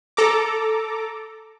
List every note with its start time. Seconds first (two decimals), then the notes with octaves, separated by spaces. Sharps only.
0.17 A4 A#5 D6